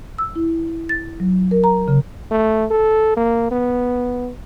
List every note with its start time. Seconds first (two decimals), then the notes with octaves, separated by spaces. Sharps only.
0.18 E6
0.36 E4
0.89 A6
1.20 F#3
1.51 A#4
1.64 A#5
1.88 C#3
2.31 A3
2.71 A4
3.17 A#3
3.51 B3